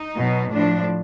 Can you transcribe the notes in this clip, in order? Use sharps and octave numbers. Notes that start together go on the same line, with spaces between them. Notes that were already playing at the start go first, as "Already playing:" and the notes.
Already playing: D#4
B2 F#3
A2 F3 D4